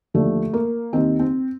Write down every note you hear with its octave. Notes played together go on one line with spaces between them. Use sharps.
D#2 D3 F3 A3
A#3
D#2 D#3 C4
C4